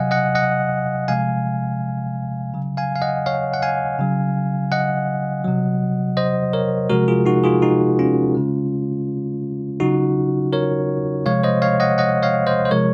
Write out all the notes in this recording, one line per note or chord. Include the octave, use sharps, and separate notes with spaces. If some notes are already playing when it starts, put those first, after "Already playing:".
Already playing: C3 F#3 D#5 F5 F#5 G#5
D#5 F#5
D#5 F#5
C3 F3 G#3 F5 G#5
C#3 F#3
F5 G#5
F5
D#5 F#5
C#5 F5
F#5
F5 G#5
C#3 F#3
D#5 F#5
C3 F#3
C5 D#5
A#4 C#5
C3 F3 G#3 F#4 A#4
F4 G#4
D#4 F#4
F4 G#4
D#4 F#4
C#4 F4
C#3 G#3
C#3 F#3 D#4 F#4
A#4 C#5
C3 F3 G#3 C#5 F5
C5 D#5
C#5 F5
D#5 F#5
D#5 F#5
C#5 F5
C5 D#5
C5
C3 F3 G#3 A#4 C#5